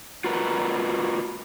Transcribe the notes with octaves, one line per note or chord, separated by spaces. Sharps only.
F4 F#4 A#4 B4